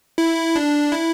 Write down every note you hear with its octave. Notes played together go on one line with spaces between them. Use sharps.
E4
D4
E4